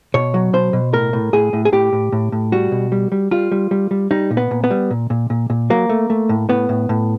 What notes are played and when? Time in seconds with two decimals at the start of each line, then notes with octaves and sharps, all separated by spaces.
0.14 B2 C#5
0.34 F#3
0.53 B2 C5
0.73 B2
0.93 A2 A#4
1.13 A2
1.33 A2 G#4
1.53 A2
1.65 G#4
1.72 A2 G4
1.93 A2
2.12 A2
2.32 A2
2.52 G3 F#4
2.72 B2
2.92 G3
3.12 G3
3.31 G3 F4
3.51 G3
3.71 G3
3.91 G3
4.11 G3 D#4
4.31 A#2
4.37 B3
4.51 A#2
4.64 B3
4.71 G3
4.91 A#2
5.10 A#2
5.30 A#2
5.50 A#2
5.70 F#3 A#3
5.89 A3
6.10 A3
6.29 A2
6.49 A2 B3
6.69 A2
6.89 A2